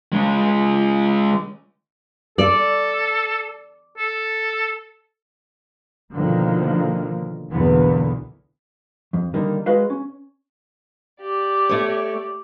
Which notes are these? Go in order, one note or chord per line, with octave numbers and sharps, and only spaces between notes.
C#3 G#3
A4 D5
A4
B2 D3 D#3 F3 A#3
B1 E2 D3 A#3 B3
F2
D3 D#3 G3 A#3 D#4
G#3 F#4 B4 D#5 F5
C#4
G4 D5
A3 C#5